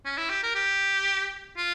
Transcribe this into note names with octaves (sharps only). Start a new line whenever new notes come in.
C#4
E4
G4
A#4
G4
F4